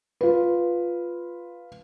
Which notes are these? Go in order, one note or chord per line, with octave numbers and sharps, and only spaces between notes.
F4 B4